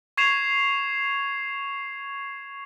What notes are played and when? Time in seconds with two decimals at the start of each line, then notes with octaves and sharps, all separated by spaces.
0.17 C#6 G#6 C7 E7 F7